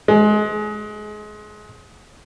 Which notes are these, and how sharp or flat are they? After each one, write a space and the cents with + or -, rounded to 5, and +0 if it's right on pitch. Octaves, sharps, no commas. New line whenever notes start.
G#3 +25